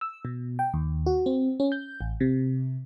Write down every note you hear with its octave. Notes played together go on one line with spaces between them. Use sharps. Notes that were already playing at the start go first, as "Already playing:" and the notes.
E6
B2
G5
D#2
F#4
C4
C#4
G6
A1
C3